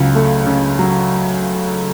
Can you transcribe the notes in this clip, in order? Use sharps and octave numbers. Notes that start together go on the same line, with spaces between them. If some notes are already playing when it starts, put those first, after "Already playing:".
Already playing: C#2 C#3 F#3
A3
C#3
F#3